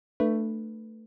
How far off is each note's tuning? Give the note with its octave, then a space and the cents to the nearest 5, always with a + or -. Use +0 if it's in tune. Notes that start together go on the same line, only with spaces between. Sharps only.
A3 +15 D4 +35 B4 +0